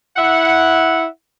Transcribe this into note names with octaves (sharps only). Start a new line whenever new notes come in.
E4 E5 F#5